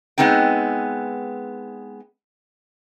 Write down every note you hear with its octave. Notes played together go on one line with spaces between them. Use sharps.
G#3 B3 C4 D#4 G5